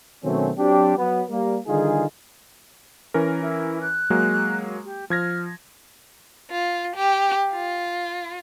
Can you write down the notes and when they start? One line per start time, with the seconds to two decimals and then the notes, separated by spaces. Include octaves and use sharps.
0.24 B2 D#3 F#3 A3 C4 C#4
0.57 F#3 C4 D4 G4
0.96 F#3 B3
1.29 G3 A#3
1.67 D3 D#3 G3 D#4 F4 G#4
3.14 E3 C#4 A#4
3.41 E4
3.81 F#6
4.10 F#3 G#3 A#3
4.84 G4
5.10 F3 F6 G#6 A#6
6.51 F4
6.96 G4
7.52 F4